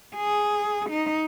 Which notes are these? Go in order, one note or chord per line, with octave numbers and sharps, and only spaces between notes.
G#4
D#4